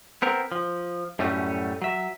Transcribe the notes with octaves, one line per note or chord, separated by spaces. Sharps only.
B3 C4 A#4
F3
F#2 A2 F#3 G3 A3 C#4
F#3 E5